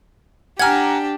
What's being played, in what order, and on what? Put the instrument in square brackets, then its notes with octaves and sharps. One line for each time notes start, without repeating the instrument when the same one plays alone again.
[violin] D4 G4 [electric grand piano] F#5 G#5 A#5 [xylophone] F6 G#6